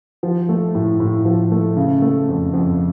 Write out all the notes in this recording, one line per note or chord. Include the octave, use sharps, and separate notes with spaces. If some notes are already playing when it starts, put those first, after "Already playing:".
F3
A3
A2
A2
F3
A3
C#3
A3
F2
F2